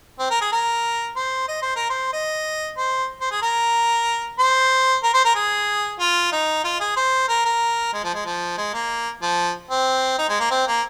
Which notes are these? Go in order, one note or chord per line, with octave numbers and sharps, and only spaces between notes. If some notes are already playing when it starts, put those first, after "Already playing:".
C4
A#4
G#4
A#4
C5
D#5
C5
A#4
C5
D#5
C5
C5
G#4
A#4
C5
A#4
C5
A#4
G#4
F4
D#4
F4
G#4
C5
A#4
A#4
G#3
F3
G#3
F3
G#3
A#3
F3
C4
D#4
G#3
A#3
C4
A#3